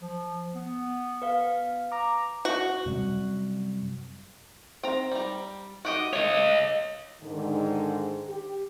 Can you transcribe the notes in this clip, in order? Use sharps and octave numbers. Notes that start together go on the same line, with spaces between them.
F3
B3
B4 F5
A#5 D6
F#4
F#2 C3 G3
C4 A#5
G3 A#5
F#4 G4 D#5
A3 C#5 D#5
G#2 D3 D#3
G4